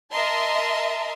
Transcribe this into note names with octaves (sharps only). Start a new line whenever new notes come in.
A#4 D#5 E5 A5 A#5 C6